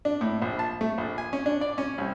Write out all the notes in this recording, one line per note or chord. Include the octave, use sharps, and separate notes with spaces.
D4
A2
A#1
A5
A3
A#1
G#5
C#4
D4
D5
C#4
C2